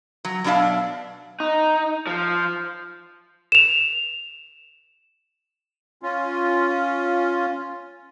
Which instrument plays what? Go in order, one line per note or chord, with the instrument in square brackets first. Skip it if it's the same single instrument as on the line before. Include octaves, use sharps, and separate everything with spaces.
[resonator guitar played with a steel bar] F#3
B2 F#3 D4 E4 E5 F5
[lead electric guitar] D#4
F3
[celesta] E7 F7
[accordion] C#4 F4